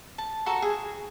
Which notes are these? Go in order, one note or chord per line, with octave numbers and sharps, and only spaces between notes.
A5
F#4 A4 A#5
G#4